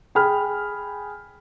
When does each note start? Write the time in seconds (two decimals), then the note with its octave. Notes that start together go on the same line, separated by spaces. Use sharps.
0.15 G#4 G5 G#5 B5 F6